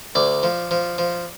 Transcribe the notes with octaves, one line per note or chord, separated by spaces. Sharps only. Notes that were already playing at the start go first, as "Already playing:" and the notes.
D2 D5
F3
F3
F3